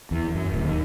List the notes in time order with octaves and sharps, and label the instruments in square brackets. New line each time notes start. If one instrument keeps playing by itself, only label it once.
[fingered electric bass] E2
F#2
D1
D#2